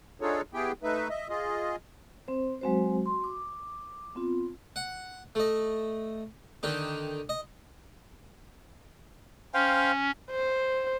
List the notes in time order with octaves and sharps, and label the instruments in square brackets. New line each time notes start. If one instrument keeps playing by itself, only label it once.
[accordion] D4 D#4 F4 G#4 A4 C#5
B3 E4 G4 G#4 G5
A3 D#4 B4 E5
D#5 E5
F4 G#4 D#5
[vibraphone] C4 C5
F#3 G#3 C4 F#4 C5
F#4 C6
D6
B3 C4 F4
[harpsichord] F#5
A3 D#5
D3 D#3 D#4 G4
D#5
[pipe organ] C#4 [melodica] C5 F5 G5
[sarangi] C5